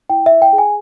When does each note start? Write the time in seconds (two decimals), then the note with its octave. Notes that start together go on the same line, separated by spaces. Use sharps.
0.10 E4 G5
0.26 E5
0.32 E4
0.42 G5
0.53 G#4
0.58 G#5